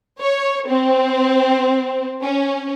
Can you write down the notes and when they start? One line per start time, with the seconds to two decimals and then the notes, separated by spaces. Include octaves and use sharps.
0.21 C#5
0.68 C4
2.22 C#4